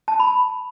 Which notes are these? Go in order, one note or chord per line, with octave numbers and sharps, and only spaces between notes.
A5
B5